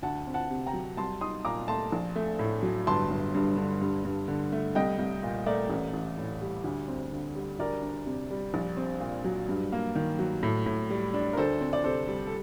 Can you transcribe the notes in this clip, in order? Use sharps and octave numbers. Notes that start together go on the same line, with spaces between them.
D2 F#5 A5
C4
F#5 A5
C3
G5 A#5
F#3
C2 A5 C6
D#4 C6 D#6
A#2 A#5 D6
A3 A5 C6
A#1
A3
A2
F#3
G1 A5 C6
G1
G2
D3
G2
G2
D3
A3
C2 D#5 G5
C2
A#2
A3 A#4 D5
A1
A1
A2
G3
D2
C4
D3
G3
D2 A#4 D5
D4
C3
G3
A#1
C4
A#2
F#3
G2
A#3
D#3
F#3
A2
A2
G3
D4
A#4
D2 A4 C5
C4
D5
C3 A4 C5
G3
A4